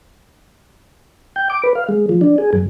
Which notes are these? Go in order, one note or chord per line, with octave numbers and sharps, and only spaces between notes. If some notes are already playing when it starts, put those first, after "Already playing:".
G5
D6
B4
F5
G#3
F3
D4
G#4
F#2